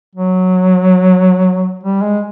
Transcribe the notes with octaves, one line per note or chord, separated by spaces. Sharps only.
F#3
G3
G#3